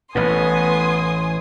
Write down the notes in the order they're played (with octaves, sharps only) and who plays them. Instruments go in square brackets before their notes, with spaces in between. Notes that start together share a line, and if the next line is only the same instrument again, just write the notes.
[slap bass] A1 A2 [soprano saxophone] B3 [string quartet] G#5 C6 D#6